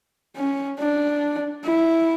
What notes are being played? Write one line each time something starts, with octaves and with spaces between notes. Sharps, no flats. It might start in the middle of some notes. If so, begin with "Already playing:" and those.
C#4
D4
E4